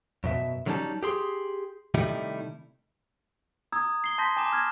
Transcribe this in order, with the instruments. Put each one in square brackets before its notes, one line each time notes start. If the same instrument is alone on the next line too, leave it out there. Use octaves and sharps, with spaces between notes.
[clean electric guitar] F#2 B2 E5
D3 F#3 G3 C#4 D#4 A5
G4 G#4 C6
C3 D#3 G3 A3 D#4 E4
[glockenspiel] A#5 D#6 E6 G#6
C7 G7
A5 C6 G6 A#6 B6
G#5 A#5 D6 E7
F6 G#6 A#6